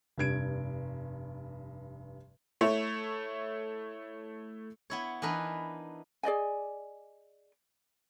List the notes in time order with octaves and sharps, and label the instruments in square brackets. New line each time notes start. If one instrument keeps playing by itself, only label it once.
[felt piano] F1 G2 G#6 D7
[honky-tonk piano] A3 E4 C#5
[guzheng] B3 E4 C#5
E3 D4 D#4 A#4 B4
[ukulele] G#4 D5 D#5 G#5